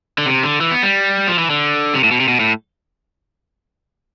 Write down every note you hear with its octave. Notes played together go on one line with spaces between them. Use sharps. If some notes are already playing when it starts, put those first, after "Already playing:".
D3
C3
D3
E3
B3
G3
F3
E3
D3
C3
A2
B2
C3
B2
A2